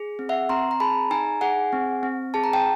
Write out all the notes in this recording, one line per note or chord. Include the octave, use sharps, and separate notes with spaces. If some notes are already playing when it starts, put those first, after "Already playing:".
Already playing: G#4
C4
E5 F#5
C4 A#5 C6
A#5
G#4 A5 B5
D#4 G#5 A#5
G#4 F#5 G#5
C4
C4
G#4 A5
A#5
G5 A5